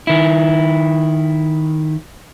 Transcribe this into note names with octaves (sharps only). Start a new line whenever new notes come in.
D#3 E4